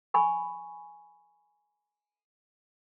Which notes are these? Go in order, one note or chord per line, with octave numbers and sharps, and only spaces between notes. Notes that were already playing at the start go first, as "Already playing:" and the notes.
G#5 B5 C#6